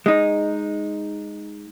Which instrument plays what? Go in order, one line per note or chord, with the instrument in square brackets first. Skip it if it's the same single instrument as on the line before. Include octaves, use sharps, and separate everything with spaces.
[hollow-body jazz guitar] G#3 D#4